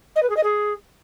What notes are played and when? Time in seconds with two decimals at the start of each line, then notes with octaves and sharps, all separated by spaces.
0.15 D#5
0.22 B4
0.29 G#4
0.36 D#5
0.43 G#4